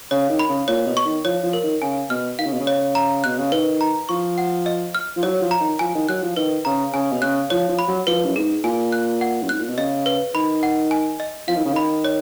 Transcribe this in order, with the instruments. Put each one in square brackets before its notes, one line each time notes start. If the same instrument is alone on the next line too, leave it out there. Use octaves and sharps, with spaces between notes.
[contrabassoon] C#3 [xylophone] C#5
[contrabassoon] D#3
[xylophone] B5
[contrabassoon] C#3
[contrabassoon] A#2 [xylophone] C#5
[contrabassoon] B2
[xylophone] C#6
[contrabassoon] D#3
[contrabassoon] F3 [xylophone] C#5
[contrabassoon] F3
[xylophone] A#4
[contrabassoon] D#3
[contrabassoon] C#3 [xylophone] G#5
[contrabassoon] B2 [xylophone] F6
[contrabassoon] D#3 [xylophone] F5
[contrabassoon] C#3
B2
C#3
[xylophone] C#5
A#5
[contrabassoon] B2 [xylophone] F#6
[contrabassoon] C#3
[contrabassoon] D#3 [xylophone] B4
[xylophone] A#5
[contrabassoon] F3 [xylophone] C#6
[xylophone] F#5
D#5
F6
[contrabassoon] F3
[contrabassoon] F#3 [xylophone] C#5
[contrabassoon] F3
[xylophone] A#5
[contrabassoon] D#3
[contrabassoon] F3 [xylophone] G#5
[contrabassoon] D#3
[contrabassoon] F#3 [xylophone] F#6
[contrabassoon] F3
[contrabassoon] D#3 [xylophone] B4
[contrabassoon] C#3 [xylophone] A#5
[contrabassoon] C#3 [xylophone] G#5
[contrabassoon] B2
[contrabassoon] C#3 [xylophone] F#6
[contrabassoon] F3 [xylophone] C#5
[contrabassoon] F3
[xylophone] B5
[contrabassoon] F#3
[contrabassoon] F3 [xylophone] B4
[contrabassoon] F#2
[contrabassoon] G#2 [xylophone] G#4
[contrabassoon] A#2 [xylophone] G#5
[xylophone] F#6
F#5
[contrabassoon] F#2
[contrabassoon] G#2 [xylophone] F#6
[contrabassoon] A#2
B2
[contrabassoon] C#3 [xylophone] D#5
[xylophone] B4
[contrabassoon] D#3 [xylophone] B5
[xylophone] F#5
G#5
D#5
[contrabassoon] F3 [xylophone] F5
[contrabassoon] D#3
C#3
[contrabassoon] D#3 [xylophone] B5
[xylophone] C#5